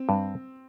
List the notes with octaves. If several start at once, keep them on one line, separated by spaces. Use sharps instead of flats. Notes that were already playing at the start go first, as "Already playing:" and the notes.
Already playing: C4
G2